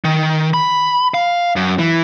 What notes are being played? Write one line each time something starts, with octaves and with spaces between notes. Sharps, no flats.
D#3
B5
F5
F#2
E3